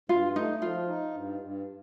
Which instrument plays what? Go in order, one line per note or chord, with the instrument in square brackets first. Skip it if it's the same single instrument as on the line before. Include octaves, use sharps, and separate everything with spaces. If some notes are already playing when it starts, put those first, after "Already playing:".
[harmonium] G2 [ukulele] F4
[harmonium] A3 [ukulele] D#4
[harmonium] F3 [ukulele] F4
[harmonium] D#4
G2
G2